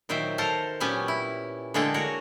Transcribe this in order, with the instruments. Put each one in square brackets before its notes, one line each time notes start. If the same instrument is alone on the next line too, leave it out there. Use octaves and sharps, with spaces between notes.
[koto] A#2 D#3 F#3 C5 E5 G5
A4 A#4 C5 F5 A5 A#5
A#2 F#3 B3 C#4 G4 G#5
E4
D3 G#3 A#3 G#4 A4 G5
F#4 A#4 C#5